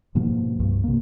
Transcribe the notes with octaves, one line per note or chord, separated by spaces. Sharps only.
G#2 B2 F3 A#3
C2 G2
C3 A#3